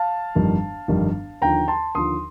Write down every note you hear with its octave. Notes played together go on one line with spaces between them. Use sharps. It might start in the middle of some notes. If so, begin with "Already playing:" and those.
Already playing: F5 A5
G1 F2 D#3 G3
G1 F2 D#3 G3
D#2 D3 F3 G5 A#5
A5 C6
D#2 D3 F3 C6 D#6